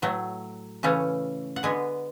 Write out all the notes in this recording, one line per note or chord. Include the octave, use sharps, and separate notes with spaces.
A2 F#3 A3
C#3 E3 A3 C#4
F#5
D3 G#3 B3 G#5